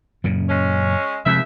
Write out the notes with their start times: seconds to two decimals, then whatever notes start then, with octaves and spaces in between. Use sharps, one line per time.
0.24 F#2 A#2 C#3
0.49 G#3 C#4
1.26 D#2 C3 F3 G#3 E5